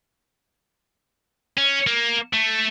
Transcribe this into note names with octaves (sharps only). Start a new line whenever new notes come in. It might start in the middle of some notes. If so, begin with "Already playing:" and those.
C#4
A#3
A3